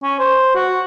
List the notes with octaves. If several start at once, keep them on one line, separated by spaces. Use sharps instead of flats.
C#4
C5
F#4